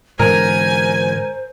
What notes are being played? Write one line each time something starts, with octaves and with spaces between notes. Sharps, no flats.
G#2 D3 E3 A#4 C5 G#5